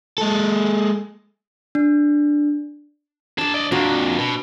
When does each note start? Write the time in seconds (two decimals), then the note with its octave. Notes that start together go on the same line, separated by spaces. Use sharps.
0.18 G#3 A4
1.75 D4
3.38 D4 G#4 A5 D6
3.54 D5 D#5
3.72 F2 A#2 D4 F#4
4.19 B2